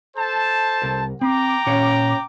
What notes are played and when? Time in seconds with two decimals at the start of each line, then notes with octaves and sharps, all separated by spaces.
0.16 A4 C5 A5
0.82 C2 A#4
1.21 C4 G5 A#5 D6
1.66 A#2 C#4 C#5